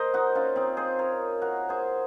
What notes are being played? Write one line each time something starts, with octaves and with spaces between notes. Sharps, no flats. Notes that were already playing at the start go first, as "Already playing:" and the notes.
Already playing: A#4 C5 D#5
D#4 F#4
C#4 F4
C4 D#4
G#4 C5
A#4 C#5
F#4 A#4
G#4 C5